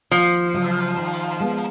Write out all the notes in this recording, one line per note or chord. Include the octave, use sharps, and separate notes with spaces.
D#2 F3
C#3 F#3
D#3
G#3 B3